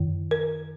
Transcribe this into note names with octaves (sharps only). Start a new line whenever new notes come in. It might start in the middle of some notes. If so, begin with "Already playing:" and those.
Already playing: F#2 D#3
A#4